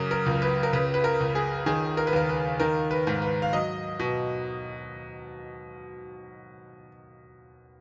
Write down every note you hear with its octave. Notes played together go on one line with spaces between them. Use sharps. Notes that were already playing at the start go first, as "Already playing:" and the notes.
Already playing: F#2 C#3 A#4
A#4
C#2
B4
A#4
C#3 B4
B4
A#4
C#2
G#4
D#3 G#4
A#4
B4
D#2 A#4
B4
D#3 A#4
B4
G#2
B4
F5
F#3 D#5
B2